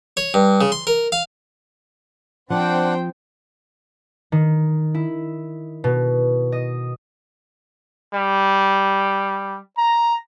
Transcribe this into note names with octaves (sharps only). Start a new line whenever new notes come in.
C#5
G2
C#3
C6
A#4
F5
F3 C4 D4 C5 F#5 G5
D#3
E4
B2
D#5
G3
A#5